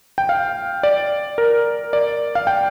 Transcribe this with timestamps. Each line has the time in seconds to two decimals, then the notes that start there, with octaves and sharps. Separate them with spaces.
0.18 G5
0.29 F5
0.83 D5
1.38 A#4
1.93 D5
2.35 F5
2.47 G5